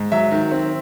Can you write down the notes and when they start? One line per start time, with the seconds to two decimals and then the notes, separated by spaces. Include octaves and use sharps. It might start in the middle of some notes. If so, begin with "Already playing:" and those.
Already playing: G#2
0.12 F#3 E5
0.31 D#3
0.51 C4